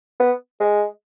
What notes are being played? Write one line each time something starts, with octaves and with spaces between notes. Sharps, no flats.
B3
G#3